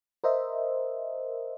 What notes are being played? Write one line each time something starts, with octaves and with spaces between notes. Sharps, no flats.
A#4 C5 D#5 E5